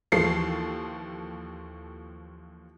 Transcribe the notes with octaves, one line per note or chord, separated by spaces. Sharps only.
D#2 E3 F3 A4 C7